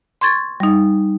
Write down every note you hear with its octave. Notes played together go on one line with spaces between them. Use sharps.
C6 C#6 G#6 A6
G3 D#4